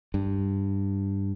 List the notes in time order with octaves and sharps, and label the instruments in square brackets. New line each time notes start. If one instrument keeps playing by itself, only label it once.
[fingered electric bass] G2